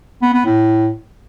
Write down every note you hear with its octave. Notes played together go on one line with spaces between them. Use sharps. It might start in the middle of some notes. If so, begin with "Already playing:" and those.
B3
B3
A2